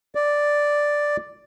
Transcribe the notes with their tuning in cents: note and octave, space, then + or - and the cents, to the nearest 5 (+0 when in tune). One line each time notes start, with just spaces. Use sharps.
D5 +0